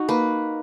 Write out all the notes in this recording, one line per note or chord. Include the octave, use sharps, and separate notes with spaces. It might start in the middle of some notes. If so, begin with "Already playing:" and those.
Already playing: D#4 F#4
A#3 B4